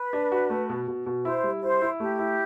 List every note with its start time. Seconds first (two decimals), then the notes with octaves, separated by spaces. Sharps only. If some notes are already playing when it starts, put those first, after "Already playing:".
Already playing: B4
0.13 D4
0.32 F#4
0.50 A3
0.69 B2
0.88 B2
1.06 B2
1.25 E4 C5
1.43 G3
1.62 E4 C5
1.82 E4
1.99 A3 G4
2.19 E4